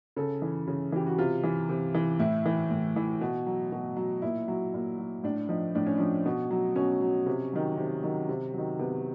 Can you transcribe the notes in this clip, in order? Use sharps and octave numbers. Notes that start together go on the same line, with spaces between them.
C#3 A4
E3
C#3
E3 G4
F#4
C3 F4
E3
C3
E3
A2 E4
E3
A2
E3
B2
F#3
B2
F#3
A#2 E4
F#3
A#2
F#3
A2 D4
F3 D#4
A2 D4
C#4
F3 D4
B2
F#3
B2 C#4
F#3
C3
D#3 F#3
C3
D#3 F#3
C3
D#3 F#3
C3 B3